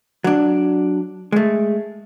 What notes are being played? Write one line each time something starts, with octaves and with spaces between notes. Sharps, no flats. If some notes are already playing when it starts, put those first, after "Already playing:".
F#3 D4
G#3 A3